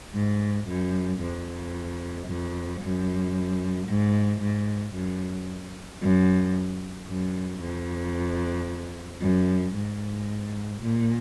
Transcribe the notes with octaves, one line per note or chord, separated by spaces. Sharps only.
G#2
F#2
F2
F2
F#2
G#2
G#2
F#2
F#2
F#2
F2
F#2
G#2
A#2